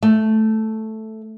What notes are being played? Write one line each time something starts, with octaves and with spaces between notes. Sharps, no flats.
A3